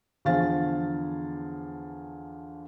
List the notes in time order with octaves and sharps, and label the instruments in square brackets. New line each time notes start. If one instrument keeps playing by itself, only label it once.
[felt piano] E2 D3 F3 F5 G#5 A6